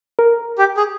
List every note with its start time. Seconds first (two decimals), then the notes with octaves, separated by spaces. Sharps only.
0.19 A#4
0.58 G4
0.77 G#4